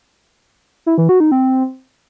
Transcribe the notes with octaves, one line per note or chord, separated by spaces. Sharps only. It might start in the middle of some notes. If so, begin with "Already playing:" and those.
E4
E3
F#4
D#4
C4